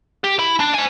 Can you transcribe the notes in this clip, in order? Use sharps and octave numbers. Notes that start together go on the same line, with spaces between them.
G4
E4
D4
C5 G#5